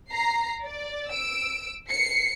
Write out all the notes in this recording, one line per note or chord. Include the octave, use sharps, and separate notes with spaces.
A#5 C7
D5
E6 D7
C7 C#7